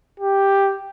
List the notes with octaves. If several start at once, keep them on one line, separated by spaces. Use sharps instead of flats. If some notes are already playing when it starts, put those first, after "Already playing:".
G4